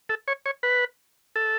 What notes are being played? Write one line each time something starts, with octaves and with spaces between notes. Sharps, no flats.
A4
C#5
C#5
B4
A4